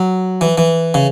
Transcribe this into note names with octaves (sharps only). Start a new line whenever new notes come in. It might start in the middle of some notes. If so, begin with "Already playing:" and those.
Already playing: F#3
E3
E3
C#3